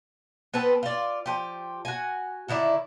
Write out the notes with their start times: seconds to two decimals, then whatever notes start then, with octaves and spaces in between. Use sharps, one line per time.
0.54 B3 C4 A4 B4
0.83 F4 D5
1.26 F3 G4
1.85 F#4 G#5
2.48 D3 D#3 E4 D5